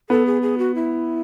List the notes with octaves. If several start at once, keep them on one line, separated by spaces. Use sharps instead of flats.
B3 A4
G#4
G#4
F#4
E4